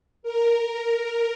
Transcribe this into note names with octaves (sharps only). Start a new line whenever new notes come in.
A#4